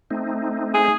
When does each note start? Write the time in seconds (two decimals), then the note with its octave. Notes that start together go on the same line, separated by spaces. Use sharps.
0.11 A3 C4 D#4
0.74 G#4